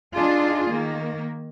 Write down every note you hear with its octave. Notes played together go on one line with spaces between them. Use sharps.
D4 D#4 F4 G#4
D#3 A#3